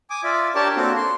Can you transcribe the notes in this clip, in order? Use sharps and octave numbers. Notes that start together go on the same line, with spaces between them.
G#5 D6 D#6
F4 D5 E5
D4 G4 A#4 C#5 D5 A5
A#3 C4 D4 F#4 A4
C6